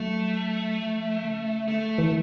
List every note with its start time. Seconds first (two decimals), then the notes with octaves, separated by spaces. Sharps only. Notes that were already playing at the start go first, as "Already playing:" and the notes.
Already playing: F#3 A3
0.79 F3
1.23 C#3
1.67 D3 A3
1.86 F3
1.98 E3